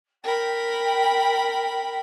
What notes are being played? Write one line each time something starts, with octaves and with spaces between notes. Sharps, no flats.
A#4 G5 B5